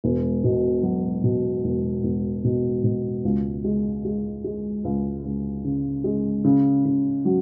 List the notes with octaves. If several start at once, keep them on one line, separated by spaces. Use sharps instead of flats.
E1
B2
F#3
B2
E1
E1
B2
B2
C#2
G#3
G#3
G#3
C#2
C#2
C#3
G#3
C#3
C#3
F#3